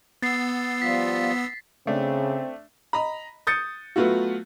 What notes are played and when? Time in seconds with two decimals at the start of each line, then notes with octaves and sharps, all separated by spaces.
0.22 B3 E6 A6 C7
0.82 F3 G3 F4 B6
1.87 C#3 A3 C4 D4
2.93 D#5 A#5 B5
3.47 D#6 G6 A6 C#7
3.96 F#3 A3 B3 F4 F#4